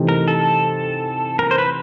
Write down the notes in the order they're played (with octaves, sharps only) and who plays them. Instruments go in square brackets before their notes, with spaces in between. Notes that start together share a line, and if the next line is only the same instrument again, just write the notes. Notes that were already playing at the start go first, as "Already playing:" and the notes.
Already playing: [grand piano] C3 E3 A3 C4 D#4
[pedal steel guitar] A#4
A4
A#4
C5
B4